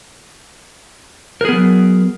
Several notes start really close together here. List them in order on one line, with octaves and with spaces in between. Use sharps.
A#4 G#4 B3 F#3